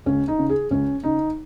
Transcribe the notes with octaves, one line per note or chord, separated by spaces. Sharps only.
C#2 C#4
D#4
C#3
G#4
C#2 C#4
C#3 D#4